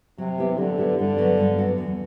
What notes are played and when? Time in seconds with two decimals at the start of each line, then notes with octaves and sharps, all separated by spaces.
0.18 C3 F#3
0.38 B3 E4 G4
0.58 D3 F#3
0.78 B3 E4 G4
0.98 G2 D3
1.17 F#3 B3 F#4
1.38 G2
1.58 F#3 B3 F#4
1.78 E2